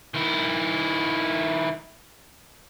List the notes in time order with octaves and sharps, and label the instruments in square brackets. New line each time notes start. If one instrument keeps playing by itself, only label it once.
[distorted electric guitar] D#3 E4